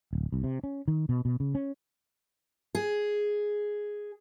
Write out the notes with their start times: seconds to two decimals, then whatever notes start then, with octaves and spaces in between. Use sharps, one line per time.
0.13 D1
0.32 C2
0.44 C3
0.64 C#4
0.88 D#3
1.09 B2
1.25 B2
1.40 C#3
1.55 C#4
2.75 G#4